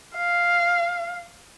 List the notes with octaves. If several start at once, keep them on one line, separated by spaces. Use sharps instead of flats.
F5